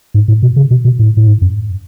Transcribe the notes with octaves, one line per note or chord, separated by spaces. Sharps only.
G#2
A2
B2
C#3
B2
B2
A2
A2
G#2
F#2